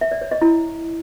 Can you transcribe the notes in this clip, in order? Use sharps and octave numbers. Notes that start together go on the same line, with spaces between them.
E5
D5
C#5
D#5
E4